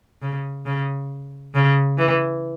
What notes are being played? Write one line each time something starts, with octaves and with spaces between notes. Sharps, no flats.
C#3
C#3
C#3
E3